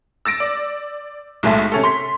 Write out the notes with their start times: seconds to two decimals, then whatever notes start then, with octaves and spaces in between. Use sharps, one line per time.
0.25 E6 A6 A#6 D7
0.40 D5
1.43 B1 A2 G#3 E5 A5
1.72 C3 C#4 A4
1.83 C6 B6